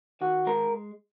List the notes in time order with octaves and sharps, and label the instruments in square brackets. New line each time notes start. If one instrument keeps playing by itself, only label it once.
[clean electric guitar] D#3 F#4
G#3 A#4